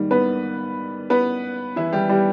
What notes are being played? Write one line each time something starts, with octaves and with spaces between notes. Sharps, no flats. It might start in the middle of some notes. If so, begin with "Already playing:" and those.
Already playing: G#2 D#3 G3 A#3
B3 B4
B3 B4
E3 E4
G3 G4
G3 G4